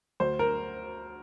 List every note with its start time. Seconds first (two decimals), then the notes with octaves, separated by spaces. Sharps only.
0.20 D2 C5
0.39 A#4